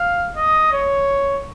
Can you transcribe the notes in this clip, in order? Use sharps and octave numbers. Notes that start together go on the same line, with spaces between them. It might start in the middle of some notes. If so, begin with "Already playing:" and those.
Already playing: F5
D#5
C#5